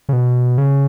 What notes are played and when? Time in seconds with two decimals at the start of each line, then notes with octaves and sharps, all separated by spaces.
0.09 C#3
0.13 B2
0.58 C#3